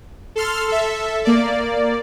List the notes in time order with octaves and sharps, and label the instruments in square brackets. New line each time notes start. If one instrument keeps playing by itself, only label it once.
[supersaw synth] A4 C6 F6
A4 E5
A#3 D5